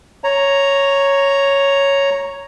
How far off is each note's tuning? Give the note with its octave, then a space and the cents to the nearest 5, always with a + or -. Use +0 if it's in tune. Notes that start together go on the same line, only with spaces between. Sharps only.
C#5 +0 A#5 +0